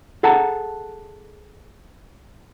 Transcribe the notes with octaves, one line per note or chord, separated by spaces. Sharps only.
G#4 A4 F#5 A5 A#5